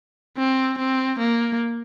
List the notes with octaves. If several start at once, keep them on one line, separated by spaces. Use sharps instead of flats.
C4
C4
A#3